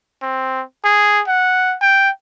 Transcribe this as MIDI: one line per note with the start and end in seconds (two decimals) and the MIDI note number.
0.22 0.62 60
0.84 1.21 68
1.28 1.75 78
1.81 2.10 79